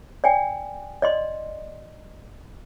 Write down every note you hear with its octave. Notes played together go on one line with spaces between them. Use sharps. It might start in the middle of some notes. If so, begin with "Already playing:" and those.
D5 G5 G#5
D5 D#5 C6